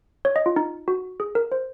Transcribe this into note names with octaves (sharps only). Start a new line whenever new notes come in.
C#5
D#5
F4
D#4
F#4
G#4
A#4
C5